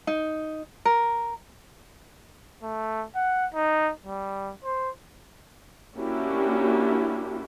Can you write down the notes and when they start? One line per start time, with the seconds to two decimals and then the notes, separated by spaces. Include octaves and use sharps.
0.07 D#4
0.85 A#4
2.63 A3
3.16 F#5
3.54 D#4
4.06 G3
4.64 C5
5.96 A#3 C#4 D4 E4 F#4 G4